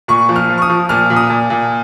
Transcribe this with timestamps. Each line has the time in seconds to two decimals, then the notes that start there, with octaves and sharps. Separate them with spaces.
0.08 A#2 C#6
0.29 F3
0.36 F6
0.49 F3
0.58 C#6
0.62 D#6
0.70 F3
0.89 A#2 F6
1.10 A#2
1.16 D#6
1.30 A#2
1.50 A#2